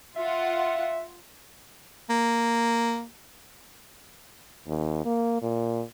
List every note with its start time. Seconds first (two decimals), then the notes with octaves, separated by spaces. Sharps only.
0.16 F4 E5 F#5
2.10 A#3
4.67 D#2
5.05 A#3
5.42 A#2